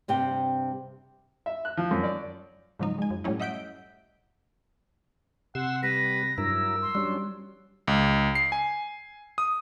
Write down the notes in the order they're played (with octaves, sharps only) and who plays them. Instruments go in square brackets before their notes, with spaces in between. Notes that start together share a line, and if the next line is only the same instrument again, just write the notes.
[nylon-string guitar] G2 C3 C4 G5
[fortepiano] E5
F#6
F3
F#2
D5
[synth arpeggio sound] G#2 C#3 F3 F#3 D#4
G#3 G#5
F#2
A2 F#3 G3 A3 C#4 E4
D#5 E5 F#5 G6 B6 D7
[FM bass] C3 [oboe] F#5 [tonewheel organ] C6 E6
[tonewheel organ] G3 [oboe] B4 [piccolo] A#6
[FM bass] G2 [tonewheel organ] F#3 E4 A#4 [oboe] E6
[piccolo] C6
[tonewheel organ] F#3 C#4 D4 [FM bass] G3
[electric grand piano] C#2
C7
G#5
D#6